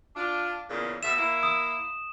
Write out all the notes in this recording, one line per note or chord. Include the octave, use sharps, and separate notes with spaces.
D4 F4
E2 A#2 C#3
B2 A4 E5 E7
A#3 E4
D#6 E7